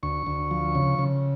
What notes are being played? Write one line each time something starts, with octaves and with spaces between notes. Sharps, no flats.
D2 C#6
D2
F3
C#3
C#3